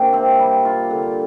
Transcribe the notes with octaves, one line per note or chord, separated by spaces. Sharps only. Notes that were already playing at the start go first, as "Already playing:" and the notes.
Already playing: C3 A#3 D4 G4
C4
G3
F4
D3